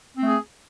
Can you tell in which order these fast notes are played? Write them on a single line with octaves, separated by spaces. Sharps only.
C4 A3 G#4